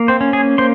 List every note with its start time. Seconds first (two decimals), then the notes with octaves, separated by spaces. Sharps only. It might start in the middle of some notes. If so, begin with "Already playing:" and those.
Already playing: A#3
0.08 C4 C5
0.21 C#4
0.33 G#4 G#5
0.58 A#3 C5 C6